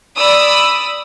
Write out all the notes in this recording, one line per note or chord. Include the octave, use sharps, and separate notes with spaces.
D5 B5 D#6 E6